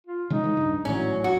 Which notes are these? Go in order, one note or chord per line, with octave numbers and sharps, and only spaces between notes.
F4
C#3 E3 G#3 D#4
E3 G#3
D1 G2
G#1 A2 E3 F#3 C#4
E1 F#4